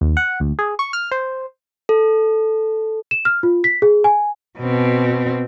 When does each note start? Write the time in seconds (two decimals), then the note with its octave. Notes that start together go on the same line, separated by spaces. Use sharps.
0.01 D#2
0.17 F#5
0.40 D2
0.59 G#4
0.79 C#6
0.93 F6
1.11 C5
1.89 A4
3.11 E7
3.25 F6
3.43 F4
3.64 B6
3.82 G#4
4.04 G#5
4.59 B2 C4